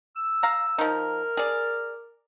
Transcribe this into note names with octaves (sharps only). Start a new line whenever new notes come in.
E6
F5 A#5
F3 D#4 A#4
G#4 D5